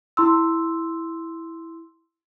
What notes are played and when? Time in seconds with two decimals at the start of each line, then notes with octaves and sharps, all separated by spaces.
0.17 E4 C6 E6